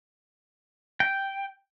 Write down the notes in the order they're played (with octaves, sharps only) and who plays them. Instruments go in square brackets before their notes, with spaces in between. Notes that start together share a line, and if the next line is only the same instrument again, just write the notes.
[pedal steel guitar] G5